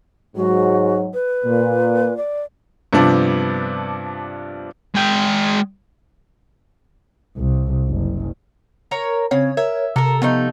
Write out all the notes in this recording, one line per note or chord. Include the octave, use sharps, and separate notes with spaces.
G#2 F#3 F#4
B4
A#2
D5
G2 C3 F3 B3 D4
G#3 G5
C2
F#1
A#4 C#5 A#5
C#3 C4 C#5
A#4 C#5 E5
C3 A4 A#4 A#5
F3 A3 B3 D#4